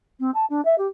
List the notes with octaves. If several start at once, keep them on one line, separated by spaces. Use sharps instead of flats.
C4
A5
D4
E5
G4